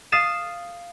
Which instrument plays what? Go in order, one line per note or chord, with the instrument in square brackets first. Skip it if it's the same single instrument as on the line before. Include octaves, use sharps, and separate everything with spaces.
[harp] F5 D#6 A6 C7 E7